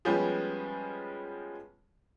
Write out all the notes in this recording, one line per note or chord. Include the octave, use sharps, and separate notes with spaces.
F3 G3 G#3 B3 C#4 G4